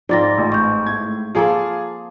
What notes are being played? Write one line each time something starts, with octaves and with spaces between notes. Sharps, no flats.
G#2 F3 A#3 C4 D5 A6 A#6
A1
C#6 G6
A2 G#6
F3 A#3 F4 G#4 A4